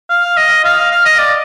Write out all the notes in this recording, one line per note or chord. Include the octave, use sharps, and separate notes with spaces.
F5
D#5
F5
F5
D#5
D5